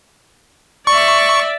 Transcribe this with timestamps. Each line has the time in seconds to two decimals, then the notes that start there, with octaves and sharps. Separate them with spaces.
0.87 D5 E5 C#6